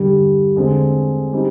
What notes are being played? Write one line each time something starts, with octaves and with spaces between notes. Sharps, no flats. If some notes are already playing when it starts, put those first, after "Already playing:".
Already playing: G2 D3 G3
D3 G#3 C4
G3 C4 D#4